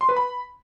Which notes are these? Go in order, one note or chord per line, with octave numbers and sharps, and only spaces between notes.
C6
B4
B5